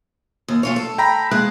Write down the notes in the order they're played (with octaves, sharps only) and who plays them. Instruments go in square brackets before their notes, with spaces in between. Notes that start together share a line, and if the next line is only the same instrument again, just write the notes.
[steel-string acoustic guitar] D#2
A3 F4 C#5
A4
[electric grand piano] G5 A#5 B5
[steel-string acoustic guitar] G#3 A#3 [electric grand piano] F#6